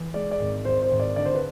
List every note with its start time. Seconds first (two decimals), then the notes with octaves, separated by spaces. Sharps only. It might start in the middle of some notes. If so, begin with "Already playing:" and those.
Already playing: E3
0.14 G#3 D5
0.31 D5
0.40 G#1
0.65 G#1 C5
0.82 C5
0.91 G#1
1.00 D5
1.16 D3 D5
1.25 C5
1.35 B4